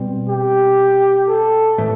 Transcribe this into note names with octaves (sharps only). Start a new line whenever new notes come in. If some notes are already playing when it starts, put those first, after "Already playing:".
Already playing: B2 G3 C4
G4
A4
A2 E3 A3